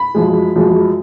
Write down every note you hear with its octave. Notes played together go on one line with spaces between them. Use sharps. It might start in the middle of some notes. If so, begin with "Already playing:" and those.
Already playing: B5
F#2 F3 G#3
F#2 F3 G#3